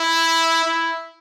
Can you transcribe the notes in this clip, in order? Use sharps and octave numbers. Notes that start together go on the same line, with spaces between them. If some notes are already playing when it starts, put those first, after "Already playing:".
Already playing: E4
E4